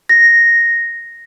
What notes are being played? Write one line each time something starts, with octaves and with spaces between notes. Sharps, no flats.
A#6